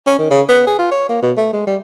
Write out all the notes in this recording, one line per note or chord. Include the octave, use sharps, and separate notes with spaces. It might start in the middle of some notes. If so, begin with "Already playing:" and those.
C#4
D#3
C#3
B3
G#4
F4
C#5
A#3
B2
A3
G#3
G3